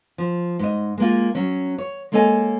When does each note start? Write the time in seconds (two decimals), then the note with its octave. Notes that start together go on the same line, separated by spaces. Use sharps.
0.18 F3
0.59 G#2 D#5
0.98 G#3 A#3 F4
1.35 F#3 C#4
1.78 C#5
2.12 G#3 A#3 A4 C#5 D#5 G#5